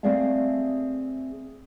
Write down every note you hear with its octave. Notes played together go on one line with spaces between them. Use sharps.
A3 C4 G#4 D5 E5 F5